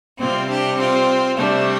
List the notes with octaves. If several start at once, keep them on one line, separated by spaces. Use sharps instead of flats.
C3 G3 C4 F4
D4 G4
C4 F4
C3 G3 A3 D4